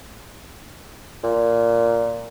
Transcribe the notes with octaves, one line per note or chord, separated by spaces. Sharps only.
A#2